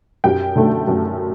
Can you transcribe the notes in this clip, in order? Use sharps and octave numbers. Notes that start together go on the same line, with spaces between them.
F#2 G4 G5
D3 A3
F#2